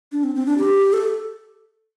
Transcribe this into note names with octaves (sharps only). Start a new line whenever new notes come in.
D4
C4
C4
D4
G4
A4